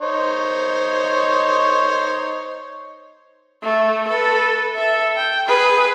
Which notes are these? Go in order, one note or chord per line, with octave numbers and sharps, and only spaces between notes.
D#4 C5 C#5
A3
A4 B4
A4 E5
G5
G#4 B4